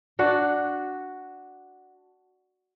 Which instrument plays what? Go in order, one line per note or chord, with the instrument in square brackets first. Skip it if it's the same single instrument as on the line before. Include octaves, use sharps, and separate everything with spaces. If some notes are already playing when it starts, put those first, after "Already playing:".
[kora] D4 F#4 F#5